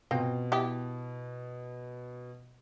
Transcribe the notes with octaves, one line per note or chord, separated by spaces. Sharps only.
B2 C4 F4 G5
B3 E4 G4